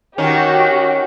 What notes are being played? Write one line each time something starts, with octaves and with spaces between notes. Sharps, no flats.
D#3 C#4 F#4 G4